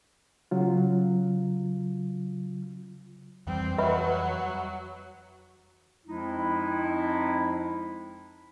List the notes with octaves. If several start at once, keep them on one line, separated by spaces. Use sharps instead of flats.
C#3 F#3 F4
F2 E3 G3 C4
F#3 B4 E5 B5
F2 F3 G#3 C4 D#4 E4